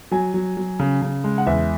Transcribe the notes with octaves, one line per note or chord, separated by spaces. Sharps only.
F#3 G#5
F#3
F#3
C#3
C#3
G#3
F#5
E2 E5